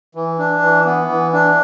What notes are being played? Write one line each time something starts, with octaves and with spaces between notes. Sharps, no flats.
E3
D4
E3
B3
E3
D4